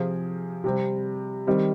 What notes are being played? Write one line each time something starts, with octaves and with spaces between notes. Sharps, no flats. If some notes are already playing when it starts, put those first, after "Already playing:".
Already playing: C3 F3 C4 F4 G#4
C3 G3 C4
D#3 G3 C4